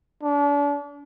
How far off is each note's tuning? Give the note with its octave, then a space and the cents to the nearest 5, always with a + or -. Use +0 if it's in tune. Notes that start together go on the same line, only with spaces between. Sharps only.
D4 -35